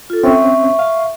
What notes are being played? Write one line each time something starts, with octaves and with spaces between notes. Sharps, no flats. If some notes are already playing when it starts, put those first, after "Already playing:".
F4 A4
C4 C#4 E5 C#6
F5